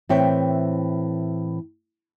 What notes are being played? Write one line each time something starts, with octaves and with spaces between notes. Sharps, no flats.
A2 E3 C4 C#5 E5 G5